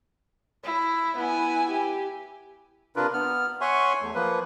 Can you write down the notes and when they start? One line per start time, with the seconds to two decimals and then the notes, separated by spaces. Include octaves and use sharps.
0.64 E4
1.18 B3 E4 G#5
1.67 G4
2.96 C3 D4 F4 A#4 B4
3.13 B3 F6
3.61 C#5 E5 F#5 G#5 C6 C#6
4.01 E2 A3
4.15 F3 A#3 B4